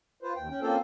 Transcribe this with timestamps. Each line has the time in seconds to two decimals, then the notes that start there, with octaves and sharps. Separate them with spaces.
0.23 F4 B4 C5
0.36 D#2 G5
0.50 C#4 G5
0.62 A#3 C4 C#4 F4 A4 C5